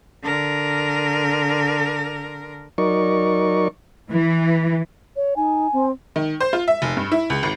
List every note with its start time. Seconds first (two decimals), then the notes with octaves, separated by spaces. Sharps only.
0.23 D3 A#4
2.78 F#3 D#4 A#4 D5 C#6
4.11 E3
5.16 C#5
5.36 D#4 G#5
5.73 C4
6.16 D#3
6.40 C5
6.53 F4
6.68 E5
6.82 F1
6.97 G2
7.12 E4
7.30 C#2
7.43 G#1